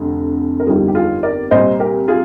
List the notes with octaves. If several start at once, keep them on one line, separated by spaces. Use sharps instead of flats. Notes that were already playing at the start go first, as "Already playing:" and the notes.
Already playing: F1 F2 D3
A#4
G1 F2 D#3 G3 F4 G#4
G4
F4 G#4
A#4 D5
C2 A#2 G3 C5 D#5
G4 A#4
F4 G#4